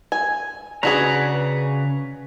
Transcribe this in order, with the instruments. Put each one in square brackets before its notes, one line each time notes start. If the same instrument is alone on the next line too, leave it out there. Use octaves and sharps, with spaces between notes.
[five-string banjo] G#5
[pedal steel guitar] C#3 B4 A#5 [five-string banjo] D4 F#4 G#4